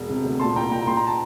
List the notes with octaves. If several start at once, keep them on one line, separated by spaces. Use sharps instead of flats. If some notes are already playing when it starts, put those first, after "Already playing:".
Already playing: E1
C3
D2
A#2 A5 C6
C2 G5 A#5
A#2 G5 A#5
A#2 C6
A#5
A5